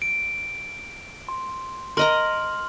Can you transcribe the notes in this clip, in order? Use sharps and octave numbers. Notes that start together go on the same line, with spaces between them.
D7
C6
A#4 D#5 A#5 C6 F6 F#7